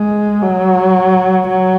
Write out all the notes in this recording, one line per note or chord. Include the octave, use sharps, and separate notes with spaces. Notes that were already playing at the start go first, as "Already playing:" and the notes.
Already playing: G#3
F#3
F#3